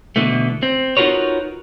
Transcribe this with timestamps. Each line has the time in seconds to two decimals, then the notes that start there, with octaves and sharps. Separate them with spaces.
0.16 B2 D3 E3 A3
0.63 C4
0.97 D#4 F4 F#4 A#4 B4 C#5